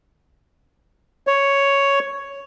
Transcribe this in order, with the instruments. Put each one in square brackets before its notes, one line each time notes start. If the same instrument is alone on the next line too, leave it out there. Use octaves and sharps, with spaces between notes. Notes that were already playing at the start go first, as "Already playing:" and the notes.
[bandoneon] C#5